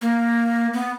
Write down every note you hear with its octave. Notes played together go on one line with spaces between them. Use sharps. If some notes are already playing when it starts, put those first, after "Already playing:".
A#3
B3